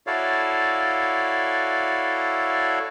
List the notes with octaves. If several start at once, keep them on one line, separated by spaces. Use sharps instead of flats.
E4 F#4 A4 C#5 D5 F5